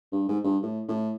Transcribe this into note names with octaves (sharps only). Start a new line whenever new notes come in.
G2
G#2
G2
A2
A2